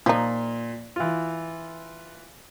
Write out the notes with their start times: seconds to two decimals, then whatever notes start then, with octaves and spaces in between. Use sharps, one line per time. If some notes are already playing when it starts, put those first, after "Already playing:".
0.06 A#2 F3 D#4
0.96 E3 F4